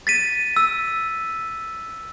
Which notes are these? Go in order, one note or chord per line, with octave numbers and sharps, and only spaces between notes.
A6 B6 D#7
E6